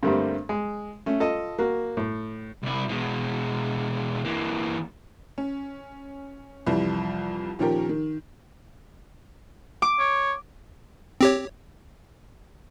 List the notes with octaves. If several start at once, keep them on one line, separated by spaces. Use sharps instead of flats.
G2 D3 G3 A3 A#3 C4
G#3
A3 C#4
F4 A4 D#5
A#3 F#4
A2
C2 E4
B2 G#3
E3 A#3
C#4
C2 F2 E3 G3
A#2 D#3 F3 C#4 G4 A#4
D#3
D6
C#5
C4 G4 C#5